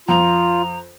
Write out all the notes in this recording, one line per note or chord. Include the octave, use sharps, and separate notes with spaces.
F2 F4 A#5